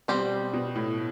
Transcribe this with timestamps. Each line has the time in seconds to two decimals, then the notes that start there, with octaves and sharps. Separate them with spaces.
0.08 B2 G3 C4 G4 C5
0.53 B2
0.75 A2